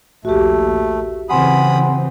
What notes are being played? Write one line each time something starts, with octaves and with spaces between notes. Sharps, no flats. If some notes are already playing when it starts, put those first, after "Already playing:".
A#1 D#2 A3 F#4 G4
C#3 E3 C4 F#5 G#5 B5 C6 D#6